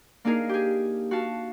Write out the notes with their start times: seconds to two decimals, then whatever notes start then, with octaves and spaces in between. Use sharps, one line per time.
0.25 A#3 D4 D#4 G#4 A#4 F5
0.49 G4 G#4
1.11 F#4 F5 A5